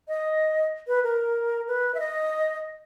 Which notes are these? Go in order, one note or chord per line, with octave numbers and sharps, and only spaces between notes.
D#5
B4
A#4
B4
E5
D#5